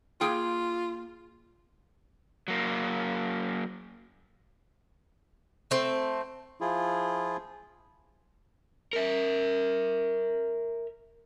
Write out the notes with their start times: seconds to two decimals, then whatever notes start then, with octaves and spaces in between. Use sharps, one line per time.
0.21 A#3 F4 G#4 G5
2.48 F#3 A#3
5.71 A3 C4
6.61 F3 E4 F4 G#4
8.93 A#4 E5